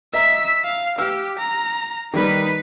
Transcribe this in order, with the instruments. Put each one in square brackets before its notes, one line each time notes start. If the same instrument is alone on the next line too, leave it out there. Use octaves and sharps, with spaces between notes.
[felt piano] D#5 E5 A#5 [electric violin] E6 B6
[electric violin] F5
[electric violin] G4 [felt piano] F5 E6 F6
[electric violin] A#5
[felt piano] D#3 G3 A#3 [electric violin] D#4 B4